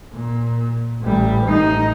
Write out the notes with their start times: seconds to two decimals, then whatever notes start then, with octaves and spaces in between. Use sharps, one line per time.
0.12 A#2
1.01 A1 G3
1.46 A1 D#4